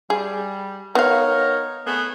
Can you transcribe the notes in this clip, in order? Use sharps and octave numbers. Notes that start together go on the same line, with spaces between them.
G3 G#4
B3 D#4 A#4 C#5 F5
A3 B3 G#4